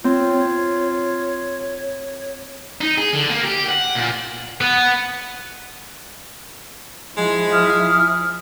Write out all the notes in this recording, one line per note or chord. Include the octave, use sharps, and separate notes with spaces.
C4 F4 C#5
D#4
G#4
D3
A#3
G4
F#5
A#2
B3
F3 G#3 E4
E5 D#6 F6